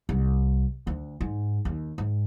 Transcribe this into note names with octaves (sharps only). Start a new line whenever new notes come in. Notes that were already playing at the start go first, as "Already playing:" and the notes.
C2
D2
G#2
D#2
G#2